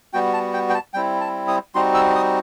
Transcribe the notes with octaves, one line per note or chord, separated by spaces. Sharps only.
G3 B3 F#4 G5
A5
G5
G5
A5
G3 C4 E4 G5
A5
D#6
G3 C4 D#4 F#4 C6
E6
D#6